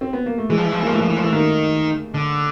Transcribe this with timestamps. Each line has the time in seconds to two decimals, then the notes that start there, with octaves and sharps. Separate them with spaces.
0.01 C4
0.13 B3
0.26 A#3
0.38 A3
0.50 E3 G#3
0.57 F3
0.65 E3
0.72 F3
0.79 E3
0.82 A#3
0.86 F3
0.91 E3 A3
1.01 F3
1.09 E3
1.17 F3
1.23 E3 A3
1.32 D#3 A#3
2.14 D3